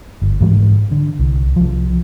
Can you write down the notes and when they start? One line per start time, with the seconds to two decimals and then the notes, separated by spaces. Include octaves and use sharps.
0.22 G1
0.41 G#2 E3 F#3 G3
0.91 D3
1.19 C2
1.56 C2 F3